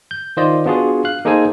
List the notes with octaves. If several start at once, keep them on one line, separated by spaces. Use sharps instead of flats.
G6
D#3 F4 C5 D5 D#5
B3 D4 F4 F#4 G#4
F5 F#6
A#3 D#4 G#4 A4 C5 G#5